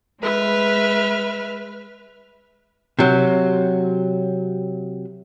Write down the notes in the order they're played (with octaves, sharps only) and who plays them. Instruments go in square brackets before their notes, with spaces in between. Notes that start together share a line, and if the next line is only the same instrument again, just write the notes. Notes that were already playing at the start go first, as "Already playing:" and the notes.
[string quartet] G#3 B4 E5 F6
[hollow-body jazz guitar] C3 F#3